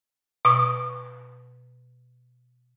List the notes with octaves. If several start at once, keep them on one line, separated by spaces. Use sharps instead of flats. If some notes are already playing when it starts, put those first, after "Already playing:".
B2 C#6 D#6